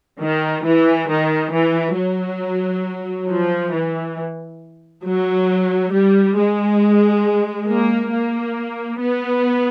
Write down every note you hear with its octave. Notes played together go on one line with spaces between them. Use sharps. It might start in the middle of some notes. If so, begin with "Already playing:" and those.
D#3
E3
D#3
E3
F#3
F3
E3
F#3
G3
G#3
A#3
A#3
B3